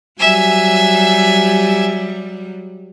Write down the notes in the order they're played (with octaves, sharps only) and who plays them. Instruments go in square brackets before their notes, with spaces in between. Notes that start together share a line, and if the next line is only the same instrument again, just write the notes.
[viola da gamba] F#3 G3 [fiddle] E5 G#5